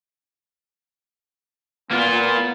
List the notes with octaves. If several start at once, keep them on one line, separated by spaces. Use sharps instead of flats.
A#3 B3 F4